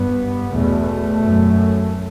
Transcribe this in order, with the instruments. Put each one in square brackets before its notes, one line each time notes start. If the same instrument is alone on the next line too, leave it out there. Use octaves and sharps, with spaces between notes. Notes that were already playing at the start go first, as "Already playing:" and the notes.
Already playing: [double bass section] G2 B3
E2 B2 A3
F#2